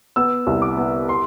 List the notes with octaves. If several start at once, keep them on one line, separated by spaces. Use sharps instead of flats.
B3 E6
C2
D6
B3
C6